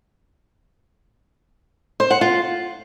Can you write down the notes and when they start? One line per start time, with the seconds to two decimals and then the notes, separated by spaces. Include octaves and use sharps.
2.00 C5
2.11 F#5
2.21 F4